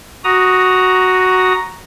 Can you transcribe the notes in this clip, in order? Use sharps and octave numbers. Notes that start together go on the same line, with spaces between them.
F#4 A#5 D#6